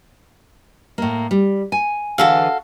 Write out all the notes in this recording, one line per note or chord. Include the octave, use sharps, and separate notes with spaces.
A2 A#3
G3
G#5
D3 E3 F#4 G#4 A4 F5